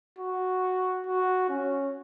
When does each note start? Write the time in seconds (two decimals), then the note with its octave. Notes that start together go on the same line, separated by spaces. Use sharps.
0.18 F#4
1.07 F#4
1.49 C#4